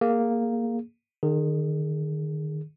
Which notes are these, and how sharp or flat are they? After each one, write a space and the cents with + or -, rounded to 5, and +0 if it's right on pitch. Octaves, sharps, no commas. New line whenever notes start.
A#3 +0 G#4 +5
D#3 -30 G#4 +0